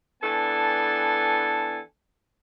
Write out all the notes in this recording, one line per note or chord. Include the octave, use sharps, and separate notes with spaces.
E3 B3 D4 A4 G#5 A5